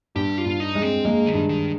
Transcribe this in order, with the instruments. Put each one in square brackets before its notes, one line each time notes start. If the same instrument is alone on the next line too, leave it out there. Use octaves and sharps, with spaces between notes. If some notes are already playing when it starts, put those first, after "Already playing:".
[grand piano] G2 [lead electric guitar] G4
[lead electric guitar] F4
[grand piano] G2
[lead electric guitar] D#4
[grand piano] G#3
[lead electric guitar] C4
[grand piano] G#3 [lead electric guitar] A#3
[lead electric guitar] D#3
[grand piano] G2
[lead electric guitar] D#3